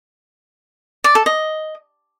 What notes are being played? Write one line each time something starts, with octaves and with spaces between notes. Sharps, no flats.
D5
A4
D#5